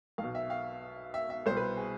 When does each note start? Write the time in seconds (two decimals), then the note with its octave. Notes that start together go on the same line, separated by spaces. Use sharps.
0.18 B1 F5
0.23 B2
0.35 E5
0.50 F5
1.14 E5
1.30 E5
1.46 C2 B2 C5
1.57 B4
1.77 G#4